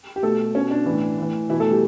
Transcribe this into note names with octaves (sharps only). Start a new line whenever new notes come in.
G4
B2 A3 A4
B2 C#4
D4
A2 E3
A2 E3
B2 E3 E4
A3 A4
G3 G4